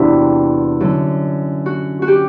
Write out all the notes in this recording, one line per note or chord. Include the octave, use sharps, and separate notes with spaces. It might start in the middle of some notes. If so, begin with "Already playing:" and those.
Already playing: E2 C3 E3 C4 D4 E4 F#4
F#2 D3
F#4
F#4
G4